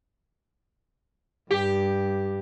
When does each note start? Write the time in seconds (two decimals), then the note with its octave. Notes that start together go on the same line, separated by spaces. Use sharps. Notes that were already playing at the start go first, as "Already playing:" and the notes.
1.51 G2 G4